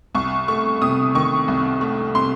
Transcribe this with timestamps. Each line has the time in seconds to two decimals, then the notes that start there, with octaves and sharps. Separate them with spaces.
0.15 C2 C#6
0.48 A3 C#6
0.82 C3 D#6
1.15 D#3 C#6
1.48 C2
1.81 A3
2.15 C3 C6